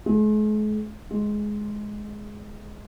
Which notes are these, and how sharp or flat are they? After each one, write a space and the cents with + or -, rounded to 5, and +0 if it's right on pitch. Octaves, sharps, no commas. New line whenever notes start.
G#3 +45
G#3 +10